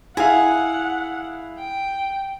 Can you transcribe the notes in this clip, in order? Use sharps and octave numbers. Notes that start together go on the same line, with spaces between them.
E4 G#4 F5 F#5
G5